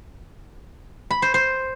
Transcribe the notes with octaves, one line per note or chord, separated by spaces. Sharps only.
B5
C5
C5